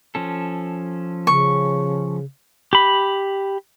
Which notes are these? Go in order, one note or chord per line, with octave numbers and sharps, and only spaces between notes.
F3 C#4 A4
C#3 C#6
G4 B5